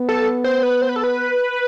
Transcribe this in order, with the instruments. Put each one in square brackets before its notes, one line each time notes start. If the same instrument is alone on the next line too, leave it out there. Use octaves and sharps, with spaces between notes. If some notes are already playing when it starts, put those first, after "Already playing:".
Already playing: [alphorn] B3
[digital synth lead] A4
C5
B4
C5
B4
A4
B4